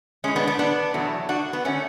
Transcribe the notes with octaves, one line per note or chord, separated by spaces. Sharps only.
A2 G#3 C#4
B3 D4
B3 D4
B3 D4
E2 B2 F#3 A3
D4 F#4
B3
D3 A3 C#4